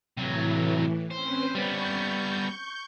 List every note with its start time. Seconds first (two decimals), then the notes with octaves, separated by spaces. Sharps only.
0.17 A2 C3 E3 F#3
1.11 C4 C#4 B4 C5
1.55 G3 B3 C#6 G6